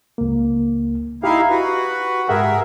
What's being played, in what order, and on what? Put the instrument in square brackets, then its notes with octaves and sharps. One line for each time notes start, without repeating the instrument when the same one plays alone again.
[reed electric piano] C#2 A#3
[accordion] D#4 E4 F5 [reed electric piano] G4
[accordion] F#4 B4
[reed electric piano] G#2 G4 F#5 [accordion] G#4 A#4 E5